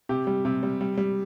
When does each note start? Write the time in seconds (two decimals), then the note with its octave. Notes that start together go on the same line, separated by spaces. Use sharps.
0.09 C3 G4
0.27 G3
0.45 C3
0.63 G3
0.81 G3
0.98 G3